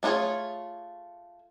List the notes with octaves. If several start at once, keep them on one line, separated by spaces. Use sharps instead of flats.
A3 D4 F4 G#4 C#5